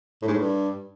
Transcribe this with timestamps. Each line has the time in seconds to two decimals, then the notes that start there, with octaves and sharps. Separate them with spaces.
0.22 A2
0.28 G#2
0.33 A2
0.39 G2